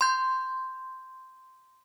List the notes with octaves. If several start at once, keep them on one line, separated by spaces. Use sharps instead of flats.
C6 G6